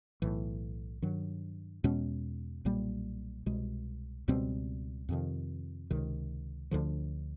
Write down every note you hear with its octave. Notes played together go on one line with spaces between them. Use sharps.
B1 A2 E3
G2 D#3 F#3
E2 B2 G#3 C#4
B1 A#2 G3 A#3
C2 B2 G#3
C#2 B2 G3 C4
F2 C3 D#3
C#2 C3 D#3
D2 D3 F3